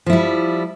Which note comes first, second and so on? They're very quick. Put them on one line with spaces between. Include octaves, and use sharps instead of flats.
F3 E4 G3